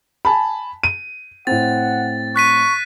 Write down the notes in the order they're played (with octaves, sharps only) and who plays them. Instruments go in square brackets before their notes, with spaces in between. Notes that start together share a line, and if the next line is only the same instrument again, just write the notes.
[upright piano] G#5 A5 B5
D#7
[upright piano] A2 C4 [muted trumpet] F#5 [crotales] A6
[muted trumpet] C#6 [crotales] F#6 B6 D#7